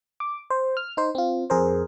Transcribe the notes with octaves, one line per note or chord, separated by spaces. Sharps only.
D6
C5
F6
D#4 C5
C4 F4
F2 G#4 A#4 C5